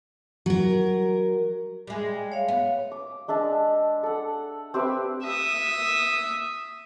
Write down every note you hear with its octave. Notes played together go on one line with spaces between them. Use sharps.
F#3 A#4
G3 G#3
C#5 E5 F5
B3
D6
G#3 D4 E5 A5
A4 F#5
C4 G4 B4 E5
E5 D#6